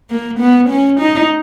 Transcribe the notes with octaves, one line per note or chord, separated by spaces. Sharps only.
A#3
B3
C#4
D#4